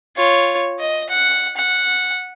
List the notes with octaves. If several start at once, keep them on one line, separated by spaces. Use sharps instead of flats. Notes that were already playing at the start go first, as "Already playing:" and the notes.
F4 C#5
D#5
F#5
F#5